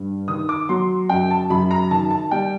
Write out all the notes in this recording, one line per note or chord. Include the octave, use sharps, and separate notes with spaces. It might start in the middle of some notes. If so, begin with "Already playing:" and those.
Already playing: G2
D#3 D#6
D6
F#3 C6
F#2 G5
A5
F#2 B5
A#5
D#3 A5
A5
G3 G5